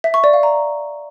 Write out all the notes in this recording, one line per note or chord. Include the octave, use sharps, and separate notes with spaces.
E5
C#6
D5
F5
A#5